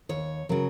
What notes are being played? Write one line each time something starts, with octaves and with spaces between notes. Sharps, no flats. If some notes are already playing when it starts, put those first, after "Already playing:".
D#2 C#5
C#3 F#3 A#4